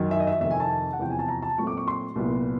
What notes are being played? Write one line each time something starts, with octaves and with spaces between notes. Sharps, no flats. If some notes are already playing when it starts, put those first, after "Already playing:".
Already playing: F#2 D#3 F#3
E5
D#5
E5
F2 C3 D#3 E5
G#5
A5
F#5
E2 C3 F3 G5
G#5
A5
A#5
A5
A#2 F#3 A3 C4 C#6
D6
C#6
C6
C2 A#2 F#3 B3